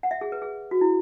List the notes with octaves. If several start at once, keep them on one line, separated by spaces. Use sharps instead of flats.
F#5
E5
G#4
B4
G#4
F#4
E4